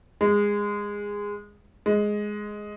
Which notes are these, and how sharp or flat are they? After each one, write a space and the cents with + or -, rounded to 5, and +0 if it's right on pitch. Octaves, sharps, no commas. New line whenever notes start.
G#3 -15
G#3 +5